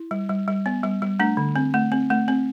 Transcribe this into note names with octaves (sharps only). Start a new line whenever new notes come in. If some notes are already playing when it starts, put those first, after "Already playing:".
Already playing: E4
G3
G3
G3
B3
G3
G3
A3 D4
D3
C4
A3
C4
A3
C4